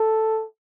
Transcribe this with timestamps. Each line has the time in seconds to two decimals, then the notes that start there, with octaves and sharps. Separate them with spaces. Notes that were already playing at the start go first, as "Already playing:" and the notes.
Already playing: A4